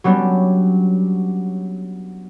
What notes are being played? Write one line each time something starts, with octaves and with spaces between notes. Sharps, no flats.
F#3 G3 B3 C#4 D4